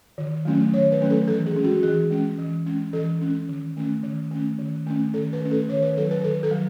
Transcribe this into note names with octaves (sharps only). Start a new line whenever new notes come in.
D#3
F#3 A3 C#4
D#3 C#5
B4
F#3 A3 C#4
A4
E3 A4
G#4
G#3 C#4
F#4
E3 G#4
G#3 C#4
E3
G#3 C#4
E3 A4
G#3 C#4
D#3
A3 C#4
D#3
A3 C#4
D#3
A3 C#4
D#3 A4
B4
A3 C#4
A4
D#3 C#5
B4
F#3 B3 A4
B4
D#3 A4
A4
F#3